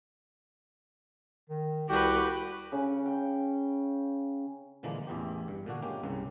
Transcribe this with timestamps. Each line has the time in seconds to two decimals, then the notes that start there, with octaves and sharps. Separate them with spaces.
1.50 D#3
1.89 C2 F#4 G4 B4 G5
2.72 C#3
3.06 G5
4.83 A#2 D3 E3 F3 G#3 A#3
5.07 A1 E2 E3 G4
5.48 G2
5.66 A#2 D3 D4 F#4
5.82 G#3 A#3 C#4 G4
6.03 C2 G2 C#3